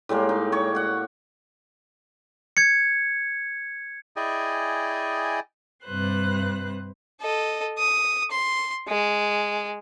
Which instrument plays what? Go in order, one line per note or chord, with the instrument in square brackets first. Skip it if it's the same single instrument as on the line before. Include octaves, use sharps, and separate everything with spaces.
[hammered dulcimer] A2 G3 G#3 A#3
D#4
C#5 C#6 D6
F#4 F#5
[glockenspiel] G#6 C#7
[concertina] E4 G#4 D5 D#5 G5 G#5
[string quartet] G2 C3 B4 C5 F#6
[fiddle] A4 D#5
D#6
C6
G#3